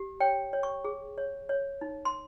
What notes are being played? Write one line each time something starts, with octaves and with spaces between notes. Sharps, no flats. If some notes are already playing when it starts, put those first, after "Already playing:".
Already playing: G4
C#5 G5
C#5
C#6
G#4
C#5
C#5
D#4
C6